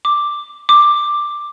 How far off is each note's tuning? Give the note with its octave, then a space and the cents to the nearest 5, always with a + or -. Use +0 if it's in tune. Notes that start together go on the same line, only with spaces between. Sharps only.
D6 +5
D6 +10